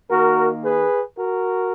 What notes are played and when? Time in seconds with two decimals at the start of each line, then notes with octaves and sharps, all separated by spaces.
0.11 D#3 A#3 F#4 A#4
0.64 G#4 B4
1.18 F#4 A#4